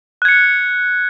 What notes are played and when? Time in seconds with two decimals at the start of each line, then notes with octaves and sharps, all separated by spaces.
0.22 F#6
0.25 G#6
0.28 C#7